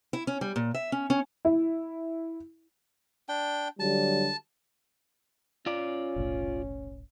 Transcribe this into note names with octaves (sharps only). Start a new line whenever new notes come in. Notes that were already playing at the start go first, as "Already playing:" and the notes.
E4
C#4
G3
A#2
E5
C#4
C#4
E4
D4 G5
D3 F#3 G3 A5
C#4 F4 D5
F1 B1 A2